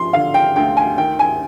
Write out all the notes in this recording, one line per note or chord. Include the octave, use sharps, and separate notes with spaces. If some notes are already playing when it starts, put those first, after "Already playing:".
Already playing: F3 C6
D3 F5
G5
D2 G5
G#5
D#3 G5
G#5